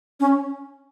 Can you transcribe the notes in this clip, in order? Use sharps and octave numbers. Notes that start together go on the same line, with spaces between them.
C#4